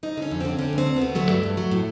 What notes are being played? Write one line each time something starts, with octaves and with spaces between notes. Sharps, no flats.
F2 D#4
D3 C#4
F2
D3 C4
D3 C#4
D2
C4
D2
B3
D2
F#3 A3
G2
G2
F#3
A2